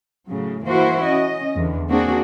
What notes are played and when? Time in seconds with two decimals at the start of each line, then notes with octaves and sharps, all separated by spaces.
0.28 A2 C#3 F#3
0.65 E3 A#3 E4 F#4 C5
1.04 C#4 D#5
1.55 E2 D3
1.89 A#3 C4 D4 F#4 G#4